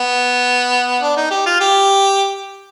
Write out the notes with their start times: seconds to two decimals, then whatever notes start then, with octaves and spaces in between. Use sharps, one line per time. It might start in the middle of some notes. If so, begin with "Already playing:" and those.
Already playing: B3
1.01 D4
1.17 D#4
1.31 G4
1.46 F4
1.61 G4